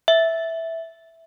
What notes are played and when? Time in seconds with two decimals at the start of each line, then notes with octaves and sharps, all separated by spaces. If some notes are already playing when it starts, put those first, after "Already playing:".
0.08 E5